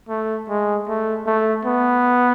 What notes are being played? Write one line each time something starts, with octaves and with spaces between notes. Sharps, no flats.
A3
G#3
A3
A3
B3